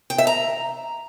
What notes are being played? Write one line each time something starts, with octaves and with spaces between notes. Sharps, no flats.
G5
E5
A#5